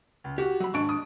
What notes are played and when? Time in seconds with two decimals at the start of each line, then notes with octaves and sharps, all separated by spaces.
0.24 C#2
0.38 F#4 G4
0.60 F#3 B5
0.74 D#2 G#2 D4 C#6 D7
0.89 D#6